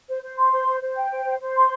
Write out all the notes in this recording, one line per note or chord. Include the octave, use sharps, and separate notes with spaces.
C5
C5
C6
C5
C5
C5
G5
C5
C5
C5
C6